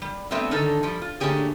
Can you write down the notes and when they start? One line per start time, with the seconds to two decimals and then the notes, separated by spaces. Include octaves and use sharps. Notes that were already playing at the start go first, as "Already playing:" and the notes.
0.02 G3
0.31 F#3 G3 A3 B3 C4 E5
0.51 D3 D#3 C#4 D#4 A4
0.83 F3 G3
1.02 F4
1.20 D3 A3 A#3 C#4 G4 G#4